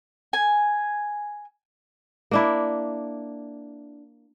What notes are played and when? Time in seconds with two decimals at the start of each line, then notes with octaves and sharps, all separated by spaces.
0.33 G#5
2.31 A#3 D4 E4